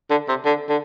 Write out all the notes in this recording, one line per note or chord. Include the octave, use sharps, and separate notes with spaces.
D3
C3
D3
D3